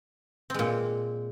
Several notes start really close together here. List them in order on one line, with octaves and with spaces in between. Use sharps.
C4 G#3 A#2